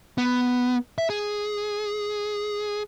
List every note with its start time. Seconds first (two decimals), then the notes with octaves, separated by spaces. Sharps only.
0.18 B3
0.98 E5
1.10 G#4